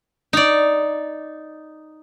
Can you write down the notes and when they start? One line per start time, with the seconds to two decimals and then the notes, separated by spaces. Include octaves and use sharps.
0.33 D#4 D5